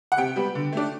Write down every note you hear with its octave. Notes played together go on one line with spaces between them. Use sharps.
F#5
C3 G5
G3 B3
D3
A3 D4